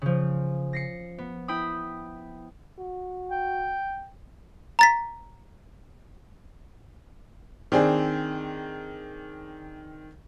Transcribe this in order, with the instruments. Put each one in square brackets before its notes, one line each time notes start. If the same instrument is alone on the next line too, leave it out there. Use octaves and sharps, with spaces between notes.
[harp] C#3 F3
A#6 C7 C#7
B3
E4 G5 B5 D#6
[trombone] F#4
[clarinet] G5
[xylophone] A#5 A6 B6
[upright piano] D#3 C4 D4 G#4